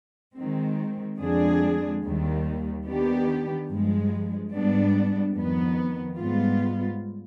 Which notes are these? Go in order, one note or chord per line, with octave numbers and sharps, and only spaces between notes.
D#3 G#3 C4
F2 D3 G#3 D4 G#4
D#2 D#3 G3
D#3 B3 D4 G4
G2 F3 G#3
G#2 G3 B3 D4
F2 D#3 B3
G#2 G3 B3 F4